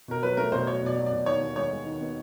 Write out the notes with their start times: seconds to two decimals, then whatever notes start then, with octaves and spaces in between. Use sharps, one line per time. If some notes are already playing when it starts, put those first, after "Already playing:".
0.08 B2 A#4
0.22 F#3 B4
0.37 A3 A#4
0.52 B2 C5
0.67 F#3 C#5
0.82 B2 D5
0.97 F#3
1.06 D5
1.12 B2
1.26 D#2 C#5
1.41 D#2
1.56 G#3 C#5
1.71 G#3
1.85 D#3
2.01 B3